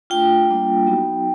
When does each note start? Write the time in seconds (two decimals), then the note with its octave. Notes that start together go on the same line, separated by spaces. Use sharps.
0.10 A3 D4 F4 G5
0.49 G3 A#3 D4 F4
0.87 F#3 B3 D#4 F#4